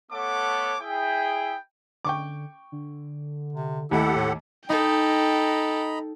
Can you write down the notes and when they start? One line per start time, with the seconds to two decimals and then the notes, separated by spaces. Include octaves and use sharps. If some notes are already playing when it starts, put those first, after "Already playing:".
0.12 A3 B3 A4 C#5 F#5 D6
0.81 E4 G#4 G5
2.05 D3 G5 C#6 D6
2.72 D3
3.53 C3
3.91 D#2 A3 E4 G4 A4 F#5
4.16 A2
4.69 D#4 A4 D#5 G5 A#5 B5